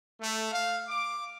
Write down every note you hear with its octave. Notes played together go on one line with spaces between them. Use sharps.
A3
F5
D6